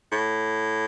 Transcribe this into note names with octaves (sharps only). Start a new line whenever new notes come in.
A2